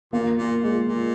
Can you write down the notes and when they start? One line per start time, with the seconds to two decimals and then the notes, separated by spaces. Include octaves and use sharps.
0.13 A#2 A#3
0.38 A#2 A#3
0.63 A#2 G#3
0.87 A#2 A#3